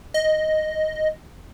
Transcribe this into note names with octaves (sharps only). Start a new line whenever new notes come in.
D#5